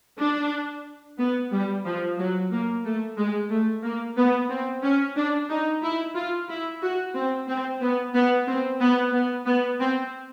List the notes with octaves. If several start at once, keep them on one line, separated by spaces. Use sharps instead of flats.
D4
B3
G3
F3
F#3
A#3
A3
G#3
A3
A#3
B3
C4
C#4
D4
D#4
E4
F4
E4
F#4
C4
C4
B3
B3
C4
B3
B3
B3
C4